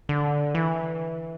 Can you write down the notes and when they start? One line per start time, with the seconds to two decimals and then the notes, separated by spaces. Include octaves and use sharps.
0.09 D3
0.55 E3